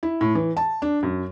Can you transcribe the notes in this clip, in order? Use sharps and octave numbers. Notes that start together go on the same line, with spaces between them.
E4
A2
E3
A5
D4
F#2